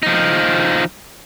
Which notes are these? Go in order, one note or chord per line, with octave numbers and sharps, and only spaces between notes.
F3 D#4